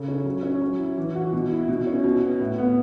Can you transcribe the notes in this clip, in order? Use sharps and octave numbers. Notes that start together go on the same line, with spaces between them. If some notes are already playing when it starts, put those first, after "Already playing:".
Already playing: C#3 A4
C#4
F#3
C#4
F#3
E4
E3
F#4
B2
E4
B2
C#4
B2
B3
A2
B3